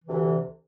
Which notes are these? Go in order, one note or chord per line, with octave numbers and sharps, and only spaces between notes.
D2 C3 E3